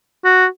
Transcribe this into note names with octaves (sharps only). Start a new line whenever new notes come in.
F#4